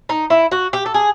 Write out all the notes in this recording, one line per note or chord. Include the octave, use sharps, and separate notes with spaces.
D#4
E4
F#4
G4
A4
G#4